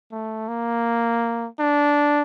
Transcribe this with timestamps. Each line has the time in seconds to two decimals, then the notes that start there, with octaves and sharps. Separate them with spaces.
0.12 A3
0.48 A#3
1.60 D4